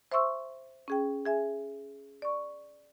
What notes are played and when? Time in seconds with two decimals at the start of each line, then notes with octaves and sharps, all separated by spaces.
0.12 C5 E5 C6 C#6 E6
0.88 C#4 G#4 G5
1.25 G#4 E5 G#5
2.22 D5 C#6